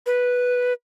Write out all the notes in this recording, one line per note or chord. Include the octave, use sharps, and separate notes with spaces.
B4